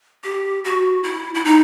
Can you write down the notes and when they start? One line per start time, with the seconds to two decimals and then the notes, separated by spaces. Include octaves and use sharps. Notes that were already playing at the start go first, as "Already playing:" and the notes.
0.24 G4
0.64 F#4
1.04 E4
1.34 E4
1.45 D#4